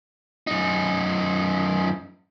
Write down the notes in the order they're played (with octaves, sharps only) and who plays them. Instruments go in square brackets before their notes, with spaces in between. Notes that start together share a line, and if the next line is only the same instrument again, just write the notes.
[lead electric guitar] F#2 D#4